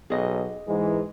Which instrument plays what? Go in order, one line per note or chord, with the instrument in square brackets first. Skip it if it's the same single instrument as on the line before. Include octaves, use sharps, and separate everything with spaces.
[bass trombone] B1 [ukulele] G#4 D#5
[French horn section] G#2 E3 [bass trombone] G#3